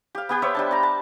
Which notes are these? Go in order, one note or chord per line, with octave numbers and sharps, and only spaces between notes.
G4 F5
B3 G4 G5
B3 C5 C#5 E5
G3 D4 A5
D5 A#5
A5